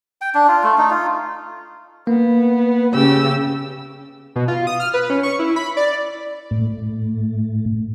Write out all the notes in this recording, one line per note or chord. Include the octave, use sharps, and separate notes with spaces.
G5
D4
F4
A3
D#4
F4
A#3 B3
C#3 G4 E6
B2
F4
D#6
F6
B4
C#4
C#6
E4
B5
D5
A2